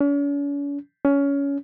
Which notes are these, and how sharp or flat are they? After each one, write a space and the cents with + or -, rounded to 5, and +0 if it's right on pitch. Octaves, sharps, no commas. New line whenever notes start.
C#4 +45
C#4 +20